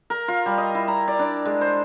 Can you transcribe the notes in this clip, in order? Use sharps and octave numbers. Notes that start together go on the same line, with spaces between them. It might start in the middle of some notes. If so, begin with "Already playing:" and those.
A#4
F4
G3
D#5
E4
A#5
D5
D4
G#3
C5